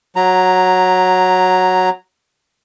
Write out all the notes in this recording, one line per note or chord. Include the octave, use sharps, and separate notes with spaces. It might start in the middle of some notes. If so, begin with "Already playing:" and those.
F#3 A#5